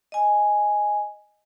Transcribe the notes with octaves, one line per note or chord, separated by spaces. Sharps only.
D#5 G#5